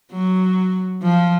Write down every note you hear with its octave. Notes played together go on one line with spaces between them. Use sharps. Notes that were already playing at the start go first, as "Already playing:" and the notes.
F#3
F3